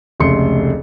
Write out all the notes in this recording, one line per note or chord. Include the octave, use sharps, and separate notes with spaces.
F1 C#2 A3 C6 C#7